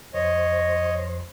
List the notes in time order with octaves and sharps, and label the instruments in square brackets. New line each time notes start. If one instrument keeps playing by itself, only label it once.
[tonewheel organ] F2 C5 [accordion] C#5 D#5